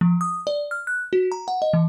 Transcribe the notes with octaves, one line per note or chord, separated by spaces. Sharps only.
F3
D#6
D5
F6
F#6
F#4
A#5
F#5
D#5
E3